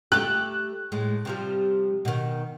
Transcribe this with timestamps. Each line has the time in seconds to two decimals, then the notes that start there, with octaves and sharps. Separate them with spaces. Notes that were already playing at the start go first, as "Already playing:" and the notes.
0.12 A3 G4 F#6
0.92 A2 G#3
1.25 C3 F3 G3
2.05 B2 D#3